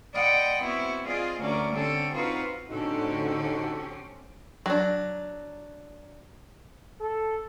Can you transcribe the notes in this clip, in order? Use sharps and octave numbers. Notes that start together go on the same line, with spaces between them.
D5 D#5 F#5 G5 B5 C6
B3 C4 E4 F#4
C4 F4 G#4 D5 D#5 F5
D2 A3 C#4 F#4 A#4 D5
D3 C4 C#4 G4 A4
C4 D#4 F4 F#4 B4 F5
A2 D3 C4 C#4 D#4 F#4 G4 A4
F#3 D4
A4